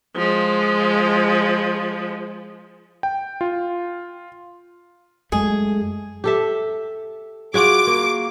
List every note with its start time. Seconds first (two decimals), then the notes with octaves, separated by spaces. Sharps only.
0.16 F3 G#3
3.03 G5
3.41 F4
5.32 F#2 G#3 A3 G#4
6.24 G4 A4 E5
7.54 F4 F#4 G#4 D6
7.87 A#3